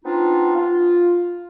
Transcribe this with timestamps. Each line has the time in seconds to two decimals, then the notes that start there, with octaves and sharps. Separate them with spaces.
0.05 B3 C4 D4 D#4 F4
0.55 F4